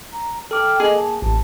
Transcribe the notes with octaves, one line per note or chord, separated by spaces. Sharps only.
A#5
A4 G5 D6 F6
A#3 G#4 D#5
A5
A1 A5